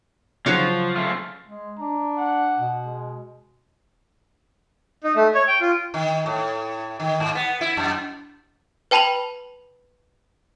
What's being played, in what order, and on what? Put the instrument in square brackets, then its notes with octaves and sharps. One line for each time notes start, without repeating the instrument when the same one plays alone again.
[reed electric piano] C#3 [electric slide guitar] F3 [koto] F#3 F#4 F5
[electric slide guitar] C#3 A3 F4 [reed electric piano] F6
[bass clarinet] G#3
[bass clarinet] D4 [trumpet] A#5
[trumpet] F#5
[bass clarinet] B2
[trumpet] G#3
[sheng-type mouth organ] D#4
A3
C#5
G5
F4
[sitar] D#3
A2
D#3
G#2
B3
E4
F#2
[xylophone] B4 G5 A5 B5 F7 F#7